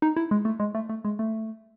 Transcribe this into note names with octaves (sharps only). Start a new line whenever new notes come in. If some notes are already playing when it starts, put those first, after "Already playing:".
D#4
E4
G#3
A3
G#3
A3
A3
G#3
A3